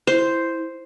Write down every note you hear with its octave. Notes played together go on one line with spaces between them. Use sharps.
E4 C5